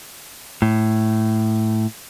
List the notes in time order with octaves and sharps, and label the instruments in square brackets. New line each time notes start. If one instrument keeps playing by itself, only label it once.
[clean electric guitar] A2